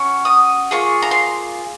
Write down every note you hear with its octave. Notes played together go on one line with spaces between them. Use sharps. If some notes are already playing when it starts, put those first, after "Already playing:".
Already playing: C#4 F#4
D#6
A#3 F4 G#4 C#6
A#5
C6